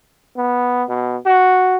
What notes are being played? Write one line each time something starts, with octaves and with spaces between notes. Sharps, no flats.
B3
B2
F#4